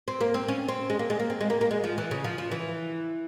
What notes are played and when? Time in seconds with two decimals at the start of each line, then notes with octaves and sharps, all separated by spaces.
0.08 C4
0.21 A#3
0.34 C4
0.48 C#4
0.68 C4
0.90 G#3
0.99 A#3
1.10 G#3
1.20 A#3
1.30 C4
1.41 G#3
1.50 A#3
1.61 A#3
1.71 G#3
1.84 F3
1.98 E3
2.11 C#3
2.24 F3
2.38 F3
2.51 E3